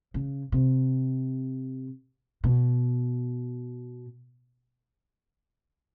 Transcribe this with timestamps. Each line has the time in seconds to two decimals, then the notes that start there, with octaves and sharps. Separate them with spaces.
0.14 C#3
0.52 C3
2.44 B2